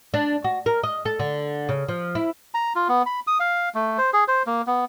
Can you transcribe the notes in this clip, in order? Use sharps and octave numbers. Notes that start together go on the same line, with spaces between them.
D4
F#4
A#4
D#5
A4
D3
C#3
F3
E4
A#5
F4
B3
B5
D#6
F5
A3
C5
G#4
C5
A#3
B3